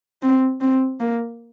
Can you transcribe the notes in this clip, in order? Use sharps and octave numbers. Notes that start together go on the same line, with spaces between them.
C4
C4
A#3